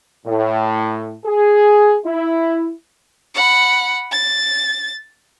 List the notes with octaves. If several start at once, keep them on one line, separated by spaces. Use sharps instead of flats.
A2
G#4
E4
F#5 B5
A6